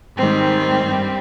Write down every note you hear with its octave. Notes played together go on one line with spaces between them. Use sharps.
G#2 D#3 G3 C4
G2 G3